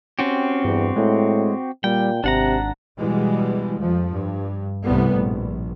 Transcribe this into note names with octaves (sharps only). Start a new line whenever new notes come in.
C4 C#4 F#4 G4
E2 G2
A2 G#3
A#2 G3 G5
G#1 C3 D4 F#5 A#5
B2 E3 G3 G#3
F2 F3
G2
C2 A2 C3 G3 B3
A#1